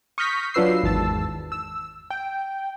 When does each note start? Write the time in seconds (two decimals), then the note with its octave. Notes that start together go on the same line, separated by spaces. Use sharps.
0.18 C#6 D#6 F6 G6 A#6 B6
0.54 F#3 D4 F4 B4 E6 C7
0.83 G#1 E2 A5 E6
1.52 E6
2.10 G5